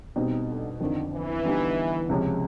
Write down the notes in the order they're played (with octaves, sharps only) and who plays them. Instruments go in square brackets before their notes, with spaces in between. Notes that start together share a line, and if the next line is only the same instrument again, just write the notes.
[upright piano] B2 G3 C4 D#4 [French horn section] D#3
[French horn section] D3
[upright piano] F2 D3 F3 [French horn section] D#3
[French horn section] E3
[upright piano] D3 G3 B3 D#4
C#2 C3 F3 G#3 C#4